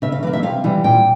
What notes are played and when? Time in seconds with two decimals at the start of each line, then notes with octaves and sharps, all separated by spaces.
0.02 C#3 E5
0.12 F5
0.23 E3 F5
0.27 A#3
0.33 E5
0.43 C3 F5
0.64 E3 G3
0.84 A#2 G5